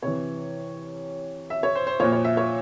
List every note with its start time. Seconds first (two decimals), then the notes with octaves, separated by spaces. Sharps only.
0.02 C3 E3 C#5
1.50 E5
1.63 C#5
1.75 C5
1.87 C5
2.00 A#2 F3 C#5
2.12 C#5
2.25 E5
2.37 C#5